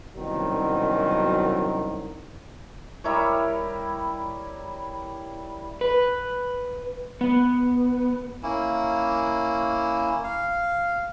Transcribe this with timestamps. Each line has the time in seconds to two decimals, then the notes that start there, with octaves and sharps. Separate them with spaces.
0.15 C2 F#2 B2 D#3 F#3
3.04 G3 E4 A#4 C#5
5.81 B4
7.21 B3
8.43 A#3 C#4 E4
10.24 F5